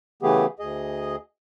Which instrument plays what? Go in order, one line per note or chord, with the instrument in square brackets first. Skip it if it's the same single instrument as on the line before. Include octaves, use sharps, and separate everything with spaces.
[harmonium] C#3 E3 A3 B3 G4 G#4
D2 G#4 D#5